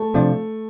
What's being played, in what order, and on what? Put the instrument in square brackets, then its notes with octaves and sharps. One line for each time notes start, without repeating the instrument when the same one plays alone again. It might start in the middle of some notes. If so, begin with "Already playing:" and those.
Already playing: [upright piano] A3
[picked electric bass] C3 F3 D4